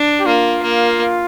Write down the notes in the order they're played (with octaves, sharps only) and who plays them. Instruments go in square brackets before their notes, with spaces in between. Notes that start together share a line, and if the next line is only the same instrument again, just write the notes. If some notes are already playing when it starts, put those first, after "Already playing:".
Already playing: [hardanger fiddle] D4
[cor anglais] G4
[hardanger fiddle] A#3 [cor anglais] F4
[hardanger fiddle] A#3